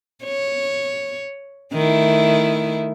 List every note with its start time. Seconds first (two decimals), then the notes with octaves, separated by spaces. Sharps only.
0.24 C#5
1.73 D#3 A3 E4